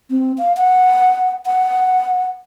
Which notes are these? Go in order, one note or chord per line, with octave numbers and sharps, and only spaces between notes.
C4
F5
F#5
F#5